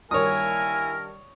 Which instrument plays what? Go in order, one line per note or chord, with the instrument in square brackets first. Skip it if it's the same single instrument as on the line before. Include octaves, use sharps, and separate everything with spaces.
[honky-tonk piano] G2 D#3 [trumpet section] A#3 E4 G#5 [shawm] A#4 [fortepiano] C#5 D#6